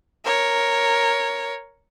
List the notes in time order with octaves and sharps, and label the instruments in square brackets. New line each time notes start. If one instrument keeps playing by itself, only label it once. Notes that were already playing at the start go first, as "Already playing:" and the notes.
[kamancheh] A#4 C#5